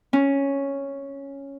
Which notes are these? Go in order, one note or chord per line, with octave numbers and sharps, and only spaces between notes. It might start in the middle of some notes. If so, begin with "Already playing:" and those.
C#4